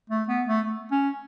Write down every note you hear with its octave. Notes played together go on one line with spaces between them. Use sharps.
A3
B3
A3
C#4